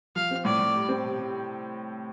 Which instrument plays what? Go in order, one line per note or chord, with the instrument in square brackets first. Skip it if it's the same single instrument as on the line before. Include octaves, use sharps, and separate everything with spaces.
[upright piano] F3 [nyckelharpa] F5
[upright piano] C4
[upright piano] A2 [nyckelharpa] D5
[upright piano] A2
G3
C4
C3
C3